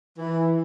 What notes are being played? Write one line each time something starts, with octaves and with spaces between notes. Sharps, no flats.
E3